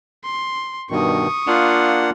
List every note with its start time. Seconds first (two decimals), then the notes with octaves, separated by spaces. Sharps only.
0.24 C6
0.90 G2 B2 D#3 C#6 D#6
1.47 A#3 D4 F4 F#5